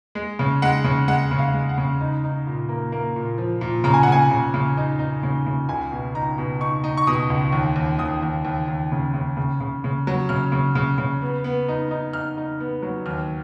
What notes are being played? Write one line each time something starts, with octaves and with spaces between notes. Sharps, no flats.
G#3
C#3
G#3 F#5
C#3
G#3 F#5
C#3
F5
G#3
F#5
C#3
D#4
D#4
A#2
A#3
A#3
A#2
F3
A#2
C#3 A#5
G#5
F#5
C#3 G#5
C#3
C#3
D#4
D#4
C#3
C#3
C#2 G#5
B2
D#4 A#5
B2
D#4 C#6
D#4
C#6
B2 D#6
C#2
D#2
D#2
D#2 D#6
D#2
D#2
D#2
C#3
C#3
C#3
C#3
C#3
F#3
C#3 F6
C#3
C#3
C#3
B3
B3
D#4
D#4
D#4 F6
D#4
B3
F#3
D#2 F6